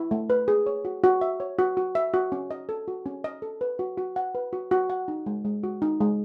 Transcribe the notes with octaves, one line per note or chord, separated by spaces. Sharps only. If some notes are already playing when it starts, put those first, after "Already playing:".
Already playing: E4
A3
B4
G#4
C#5
F#4
F#4
E5
C#5
F#4
F#4
E5
F#4
C#4
D#5
A4
F#4
C#4
D#5
A4
B4
F#4
F#4
F#5
B4
F#4
F#4
F#5
D#4
G#3
G#3
F#4
D#4
G#3